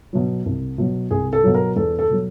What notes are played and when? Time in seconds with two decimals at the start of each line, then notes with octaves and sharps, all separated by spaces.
0.13 B2 F#3
0.46 C2
0.78 B2 F#3
1.11 C2 G#4
1.33 A4
1.43 B2 F#3
1.54 A#4
1.76 E2 A4
1.99 A4
2.10 B2 F#3